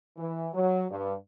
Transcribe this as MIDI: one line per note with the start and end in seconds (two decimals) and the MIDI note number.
0.17 0.47 52
0.53 0.83 54
0.90 1.13 43